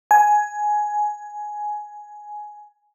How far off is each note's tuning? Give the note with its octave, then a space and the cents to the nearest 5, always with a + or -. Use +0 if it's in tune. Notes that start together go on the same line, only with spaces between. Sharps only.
G#5 +10